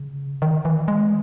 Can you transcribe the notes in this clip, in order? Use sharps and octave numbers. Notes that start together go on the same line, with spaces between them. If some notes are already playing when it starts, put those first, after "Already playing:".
Already playing: C#3
D#3
E3
G#3